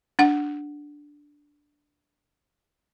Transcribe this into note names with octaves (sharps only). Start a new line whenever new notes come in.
D4 F#5